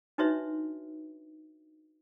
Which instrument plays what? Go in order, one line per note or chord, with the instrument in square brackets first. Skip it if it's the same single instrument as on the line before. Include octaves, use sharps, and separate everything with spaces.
[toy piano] D4 D#4 F#4 B4 C#5 E5